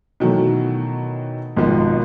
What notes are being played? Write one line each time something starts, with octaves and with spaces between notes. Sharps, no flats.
B2 D#3 E3 F#3 A3
G#1 G#2 B2 D#3 F3